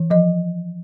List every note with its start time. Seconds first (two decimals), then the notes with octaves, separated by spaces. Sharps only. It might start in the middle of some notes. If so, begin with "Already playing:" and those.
Already playing: E3
0.10 F3 D#5